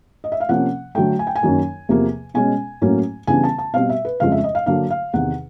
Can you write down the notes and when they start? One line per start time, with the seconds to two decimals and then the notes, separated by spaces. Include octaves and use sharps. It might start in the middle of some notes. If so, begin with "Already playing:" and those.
0.24 D#5
0.32 E5
0.40 F5
0.49 C3 F3 A#3 C#4 F#5
0.95 D3 F#3 A3 G5
1.19 G#5
1.27 G5
1.35 G#5
1.42 F#2 D#3 F#3 A#3 C#4
1.89 E2 C3 F3 A#3
2.34 B2 G#3 C#4 G#5
2.81 A2 F#3 A#3 C#4
3.27 C#3 E3 G3 B3 D4 G#5
3.44 A5
3.58 A5
3.73 B2 G3 C4 F5
3.89 E5
4.05 B4
4.20 F2 C#3 F3 G#3 F5
4.32 E5
4.44 D#5
4.55 F5
4.66 D3 F#3 A#3 D4 F5
4.90 F5
5.13 E2 C3 D#3 F#5